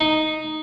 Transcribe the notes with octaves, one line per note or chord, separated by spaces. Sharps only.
D#4